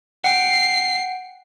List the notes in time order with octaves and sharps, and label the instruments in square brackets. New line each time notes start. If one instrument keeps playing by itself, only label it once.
[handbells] F#5 G5 [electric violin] C7